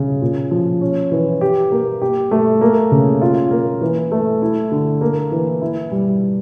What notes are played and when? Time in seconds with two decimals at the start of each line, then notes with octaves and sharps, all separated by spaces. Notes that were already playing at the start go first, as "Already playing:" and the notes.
Already playing: C#3
0.21 A#2
0.51 F3
0.81 C#4
1.11 E3
1.41 G4
1.71 A#3
2.01 G4
2.31 A3
2.61 A#3
2.91 C#3
3.21 F4
3.51 A#3
3.81 E3
4.12 A3
4.42 E4
4.72 D3
5.01 A#3
5.32 E3
5.61 E4
5.92 G3